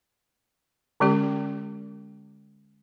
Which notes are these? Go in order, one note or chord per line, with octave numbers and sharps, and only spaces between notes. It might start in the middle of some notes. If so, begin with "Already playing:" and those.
D3 G#3 C#4 G4